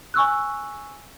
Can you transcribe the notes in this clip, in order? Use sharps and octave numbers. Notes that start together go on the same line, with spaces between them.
G#5 C#6 E6 F#6